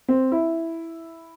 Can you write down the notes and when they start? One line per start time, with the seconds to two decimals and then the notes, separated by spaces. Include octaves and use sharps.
0.08 C4
0.32 E4